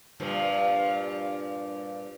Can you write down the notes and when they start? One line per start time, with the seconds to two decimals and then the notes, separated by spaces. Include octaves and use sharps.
0.20 G2 A#2 F3